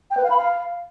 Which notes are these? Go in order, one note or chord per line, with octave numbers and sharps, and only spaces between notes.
G5
B4
F5
B5
F5